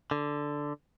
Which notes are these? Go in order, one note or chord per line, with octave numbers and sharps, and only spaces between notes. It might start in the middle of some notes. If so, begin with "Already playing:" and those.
D3